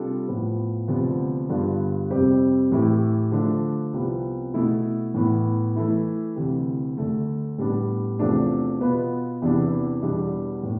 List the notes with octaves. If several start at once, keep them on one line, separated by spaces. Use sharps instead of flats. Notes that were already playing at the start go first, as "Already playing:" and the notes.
Already playing: C3 G3 D4 F4 A4
A2 F3 B3
D2 C3 F3 B3
G2 D3 G3 B3 F4
F2 C3 G3 C4 G4
A2 E3 A3 E4 G4
D3 F3 A3 D4
C2 C3 F3 B3
B2 A3 E4
A2 E3 B3
E3 A3 E4
D2 C3 E3
D2 D3 A3
A2 G3 B3 D4
E2 C3 F3 A3 D4
B2 B3 F4 B4
E2 C3 E3 B3 D4
E2 B2 G3 B3 D4
A2